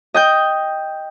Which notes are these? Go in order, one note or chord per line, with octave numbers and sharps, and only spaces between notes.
D#5 G5 G6